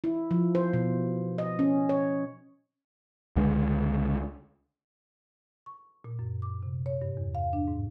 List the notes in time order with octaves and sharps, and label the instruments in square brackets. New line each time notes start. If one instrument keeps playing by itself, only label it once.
[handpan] E4
F3
C5
B2
D#5
C#4
C#5
[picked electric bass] C#2 D3 G#3
[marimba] C#6
A#2
F#2
D6
C3
C#5
G2
E2
F5
D4
G#2